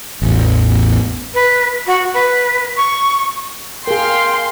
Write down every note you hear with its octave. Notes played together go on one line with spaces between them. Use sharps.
A1 E2
B4
F#4
B4
C#6
G#4 A#4 F5 G5 C6